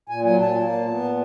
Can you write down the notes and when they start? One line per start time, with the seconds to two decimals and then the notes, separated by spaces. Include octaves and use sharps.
0.09 A#2 G#5
0.24 F#3 G#5
0.41 A#2 A5
0.56 A#3
0.71 A#2
0.88 B3
1.03 A#2